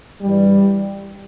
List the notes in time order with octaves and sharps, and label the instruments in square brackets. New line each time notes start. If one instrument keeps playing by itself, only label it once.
[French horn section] G2 E3 G3